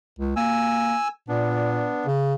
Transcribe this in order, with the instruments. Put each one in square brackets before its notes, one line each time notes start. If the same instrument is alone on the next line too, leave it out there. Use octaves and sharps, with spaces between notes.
[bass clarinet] C#2
[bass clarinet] A#3 [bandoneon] G#5 E6
[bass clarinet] A#2 [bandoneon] B3 D4
[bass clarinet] C#3